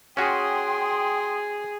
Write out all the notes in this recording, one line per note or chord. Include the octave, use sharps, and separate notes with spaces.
C#4 F#4 G#4 G5 C6 D#6